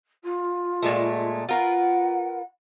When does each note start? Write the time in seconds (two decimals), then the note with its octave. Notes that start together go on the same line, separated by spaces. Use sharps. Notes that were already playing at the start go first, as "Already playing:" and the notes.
0.24 F4
0.82 A#2 G#3 A3
1.49 F4 A#4 B4 F#5